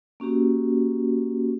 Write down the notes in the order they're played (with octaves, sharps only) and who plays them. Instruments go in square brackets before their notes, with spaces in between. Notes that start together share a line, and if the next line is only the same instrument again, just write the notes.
[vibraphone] A#3 C#4 F#4 G4